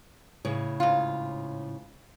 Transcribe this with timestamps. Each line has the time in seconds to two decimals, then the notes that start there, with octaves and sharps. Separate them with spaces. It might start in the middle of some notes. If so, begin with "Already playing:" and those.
0.45 A2 C#3 C#5
0.80 G#2 F4